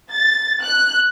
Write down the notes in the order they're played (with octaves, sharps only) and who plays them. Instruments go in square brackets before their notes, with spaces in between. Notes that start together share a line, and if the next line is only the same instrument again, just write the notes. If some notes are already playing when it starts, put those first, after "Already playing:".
[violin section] A6
F#6